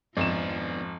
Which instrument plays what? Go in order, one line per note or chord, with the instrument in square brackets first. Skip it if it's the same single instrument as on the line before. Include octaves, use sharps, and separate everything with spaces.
[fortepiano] G#1 [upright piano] F2 E7 [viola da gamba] F3 [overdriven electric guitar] B3 D4